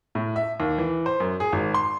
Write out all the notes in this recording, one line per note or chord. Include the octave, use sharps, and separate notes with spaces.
A2
E5
D#2
E3
C5
F#2
G#4
G#1
C6